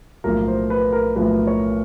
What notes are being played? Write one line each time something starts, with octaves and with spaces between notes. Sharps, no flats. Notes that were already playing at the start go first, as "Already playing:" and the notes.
B1 A2 F3 A#3 A#4
C5
B4
A#4
B1 A2 F3 A#3 B4
C#5